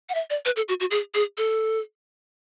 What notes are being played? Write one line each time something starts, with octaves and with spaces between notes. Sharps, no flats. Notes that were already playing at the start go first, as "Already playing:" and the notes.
F#5
E5
D5
B4
A4
F#4
F#4
G#4
G#4
A4